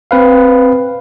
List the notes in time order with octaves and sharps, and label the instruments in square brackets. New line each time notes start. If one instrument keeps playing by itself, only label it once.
[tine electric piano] C4 B4 F5